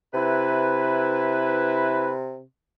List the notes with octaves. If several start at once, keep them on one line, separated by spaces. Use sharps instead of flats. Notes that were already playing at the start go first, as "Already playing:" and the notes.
C3 E4 B4